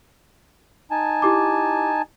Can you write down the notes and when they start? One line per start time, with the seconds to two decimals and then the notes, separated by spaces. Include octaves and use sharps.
0.91 D#4 G#5 A5
1.22 E4 G4 D6